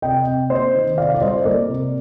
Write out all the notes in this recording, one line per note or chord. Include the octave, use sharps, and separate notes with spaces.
C3 D#5 G5
C3
A#3 C5 D#5
D#3
C3 D5 F5
D5
G3 C5 D#5
A#3 A#4 D5
C3